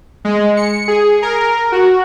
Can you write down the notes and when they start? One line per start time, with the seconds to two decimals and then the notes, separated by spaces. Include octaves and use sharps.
0.25 G#3
0.57 C#7
0.88 G#4
1.22 A#4
1.72 F#4